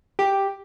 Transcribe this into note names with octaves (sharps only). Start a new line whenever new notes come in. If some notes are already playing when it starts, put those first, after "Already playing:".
G4